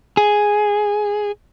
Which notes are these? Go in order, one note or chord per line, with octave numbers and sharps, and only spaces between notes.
G#4